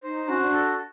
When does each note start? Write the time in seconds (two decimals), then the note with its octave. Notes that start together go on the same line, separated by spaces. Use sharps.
0.03 D#4 C5
0.28 C#4 F#4
0.40 D4
0.53 A4